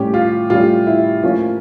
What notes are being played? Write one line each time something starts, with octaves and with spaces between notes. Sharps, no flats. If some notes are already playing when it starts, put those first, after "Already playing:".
Already playing: A2 G3 C#4 G4
F4
A2 G3 C#4 F4
E4
A2 F3 A#3 C#4 F4